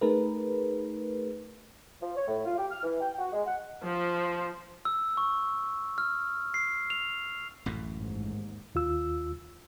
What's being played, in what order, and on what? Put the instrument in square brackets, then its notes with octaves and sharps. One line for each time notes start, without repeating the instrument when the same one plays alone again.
[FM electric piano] A3 D#4 G#4 A#4 B4
[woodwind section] F3
C#5
A2
F4
G4
F6
E3
G5
F#4
G#3
F#5
[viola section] F3
[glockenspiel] E6
C#6
F6
C7
F7
[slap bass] A1 F#2 A2
[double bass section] D#2 G#2
[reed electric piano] D#2 F4 E6